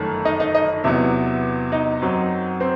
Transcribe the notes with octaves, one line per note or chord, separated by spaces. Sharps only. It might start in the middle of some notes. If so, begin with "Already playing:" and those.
Already playing: G1 F#2 D#3 A3
D#4 D#5
D#4 D#5
D#4 D#5
E2 C3 F#3 B3 E4 E5
D#4 D#5
F#2 F#3 C4
C4 C5